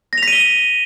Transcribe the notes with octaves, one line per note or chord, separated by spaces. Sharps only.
A#6 B6 D#7 F7 G7